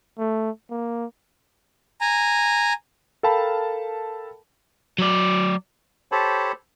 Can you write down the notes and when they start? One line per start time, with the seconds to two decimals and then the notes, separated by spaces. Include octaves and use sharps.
0.19 A3
0.70 A#3
2.01 G#5 A#5
3.23 A4 A#4 F5 G5 A5 B5
4.98 F#3 D5
6.12 G4 A4 C5 C#5 A5 B5